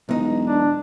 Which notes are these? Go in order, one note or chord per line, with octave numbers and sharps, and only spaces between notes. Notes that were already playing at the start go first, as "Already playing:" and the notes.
E1 B1 D#4
D4